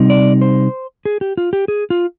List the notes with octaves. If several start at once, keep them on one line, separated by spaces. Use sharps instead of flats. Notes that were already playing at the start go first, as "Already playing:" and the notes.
Already playing: C3 G3 C4 D#4
D5
C5
G#4
G4
F4
G4
G#4
F4